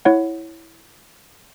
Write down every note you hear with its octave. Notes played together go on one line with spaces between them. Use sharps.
E4 C#5 F#5